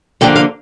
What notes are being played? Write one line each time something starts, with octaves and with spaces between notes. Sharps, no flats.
D3 F3 A#3 D4 G5
F5